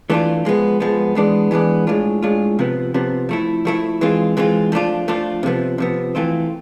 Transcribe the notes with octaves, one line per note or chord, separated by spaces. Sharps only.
E3 A3 D4 F4
F3 G#3 B3
F3 G#3 B3
E3 G#3 B3 D4
E3 G#3 B3 D4
A2 G#3 D4 F4
A2 G#3 D4 F4
C3 F3 B3
C3 F3 B3
F3 A3 E4
F3 A3 E4
E3 G#3 C4 F4
E3 G#3 C4 F4
F3 A3 D4 F4
F3 A3 D4 F4
C3 F3 B3
C3 F3 B3
E3 A3 C4 F4